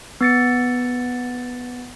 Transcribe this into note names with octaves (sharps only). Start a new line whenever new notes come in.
B3 A6 C#7